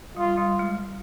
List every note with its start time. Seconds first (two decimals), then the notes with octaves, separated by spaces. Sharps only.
0.17 G3 F4
0.37 G3
0.59 G#3